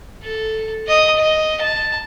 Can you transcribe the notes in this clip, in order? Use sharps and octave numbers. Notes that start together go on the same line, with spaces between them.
A4
D#5 D#6
D#5
A5